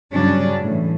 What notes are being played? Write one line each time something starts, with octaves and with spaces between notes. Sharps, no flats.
G2 C#3 F#3 C#4 D4
A2 E3